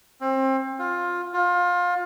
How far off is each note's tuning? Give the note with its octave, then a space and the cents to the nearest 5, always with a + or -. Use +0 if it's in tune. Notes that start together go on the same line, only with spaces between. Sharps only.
C4 +30
F4 +15
F4 +25